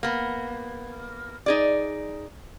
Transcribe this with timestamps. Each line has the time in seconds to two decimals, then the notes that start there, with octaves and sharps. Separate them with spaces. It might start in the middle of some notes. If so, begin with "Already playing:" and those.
0.03 A#3 B3
1.46 D#4 G#4 D5